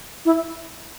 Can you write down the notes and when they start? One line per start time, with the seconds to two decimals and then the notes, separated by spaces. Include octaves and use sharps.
0.25 E4